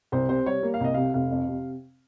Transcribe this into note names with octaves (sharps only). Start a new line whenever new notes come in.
C2 C5
C3 C5
G3 C#5
A#3
F5
C2 D#5
C3 F5
F1 F5
F2
C3